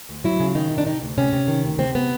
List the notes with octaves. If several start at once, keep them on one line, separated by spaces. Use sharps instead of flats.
D2
F#3 E4
C#3
D#3 D#4
C3
D4
C3 D#4
D2
C3 C#4
C3
D#3
D2
C3 C4
B3